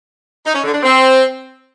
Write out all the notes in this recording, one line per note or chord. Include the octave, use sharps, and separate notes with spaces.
D#4
C#4
D3
D4
C4